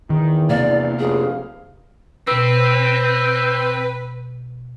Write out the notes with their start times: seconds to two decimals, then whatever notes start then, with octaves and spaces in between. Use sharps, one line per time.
0.10 E2 D#3
0.50 C3 A#3 D5 F5
0.99 F1 G#4
2.27 B2 C4 B4 E6